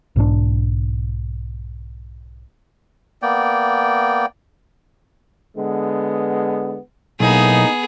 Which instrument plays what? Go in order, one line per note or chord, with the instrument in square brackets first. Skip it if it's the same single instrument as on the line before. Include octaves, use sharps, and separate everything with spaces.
[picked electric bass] B1 G#2 E3 D4
[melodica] A#3 B3 D5 G5
[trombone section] D3 G#3 B3
[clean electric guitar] B1 [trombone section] A2 A#3 D#4 [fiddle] B3 G#4